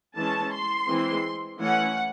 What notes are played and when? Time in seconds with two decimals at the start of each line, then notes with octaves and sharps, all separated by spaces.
0.17 E3 G#3 C#4 A5
0.53 C6
0.88 E3 G#3 C4
1.59 E3 A3 C#4 F#5